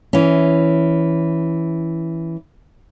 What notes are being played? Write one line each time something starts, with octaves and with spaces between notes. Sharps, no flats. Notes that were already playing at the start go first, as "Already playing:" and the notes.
E3 C#4